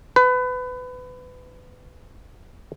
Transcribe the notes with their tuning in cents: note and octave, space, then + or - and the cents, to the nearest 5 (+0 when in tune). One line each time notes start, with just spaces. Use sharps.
B4 +25